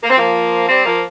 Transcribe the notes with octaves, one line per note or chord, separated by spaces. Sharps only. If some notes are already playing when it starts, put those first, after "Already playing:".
A#3
C4
F3 A#3
G3 C4
F3 A#3